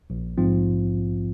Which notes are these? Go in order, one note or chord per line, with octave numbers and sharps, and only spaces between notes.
A#1
G#2 F3 C4 F4